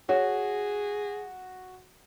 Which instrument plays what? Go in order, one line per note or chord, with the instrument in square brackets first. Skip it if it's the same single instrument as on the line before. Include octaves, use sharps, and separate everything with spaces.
[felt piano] F#4 [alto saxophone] G#4 [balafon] C#5